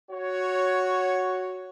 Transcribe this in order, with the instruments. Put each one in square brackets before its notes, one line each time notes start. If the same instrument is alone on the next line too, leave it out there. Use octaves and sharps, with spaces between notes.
[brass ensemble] F#4 C#5